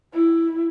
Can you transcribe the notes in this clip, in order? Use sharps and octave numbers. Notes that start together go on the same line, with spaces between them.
E4